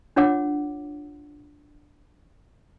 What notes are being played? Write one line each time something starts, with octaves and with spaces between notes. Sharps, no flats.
D4 F4 C#5 F#5 D6